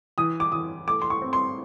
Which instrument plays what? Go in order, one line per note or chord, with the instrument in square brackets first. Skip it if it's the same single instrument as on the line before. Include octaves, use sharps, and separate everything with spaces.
[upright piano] E3 D#6
D6
E3 D#6
A3 D6
C6
C#6
C4
C6